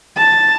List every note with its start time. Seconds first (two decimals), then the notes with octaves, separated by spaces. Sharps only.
0.17 A5